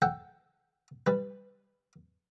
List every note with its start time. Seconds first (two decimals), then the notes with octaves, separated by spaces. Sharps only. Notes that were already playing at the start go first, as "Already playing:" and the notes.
0.02 A4 F#5 G5
1.07 G3 B4